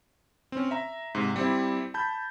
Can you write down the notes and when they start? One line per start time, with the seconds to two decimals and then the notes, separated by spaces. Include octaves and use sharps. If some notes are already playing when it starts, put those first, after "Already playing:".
0.52 C4 C#4
0.71 E5 A#5
1.15 G#2 C3
1.36 G3 C4 E4
1.94 A5 B5 G6